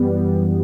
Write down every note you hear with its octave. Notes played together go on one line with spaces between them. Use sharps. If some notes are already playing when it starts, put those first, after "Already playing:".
Already playing: F#2 E3 G3 B3